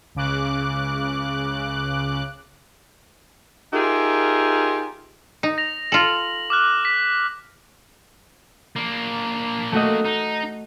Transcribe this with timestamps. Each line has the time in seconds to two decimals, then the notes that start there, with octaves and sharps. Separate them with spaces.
0.15 C#2 C#3 D6 F#6
3.73 D#4 F4 G4 G#4 A#4 E5
5.43 D#4
5.58 A#6 F7
5.92 F4 A4 F#7
6.50 D6 F6 F#6
6.85 B6
8.76 A#3 D4
9.72 A3 F#4 D#5
10.05 D#4